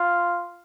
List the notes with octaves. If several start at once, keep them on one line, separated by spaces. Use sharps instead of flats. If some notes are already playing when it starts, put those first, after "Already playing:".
Already playing: F4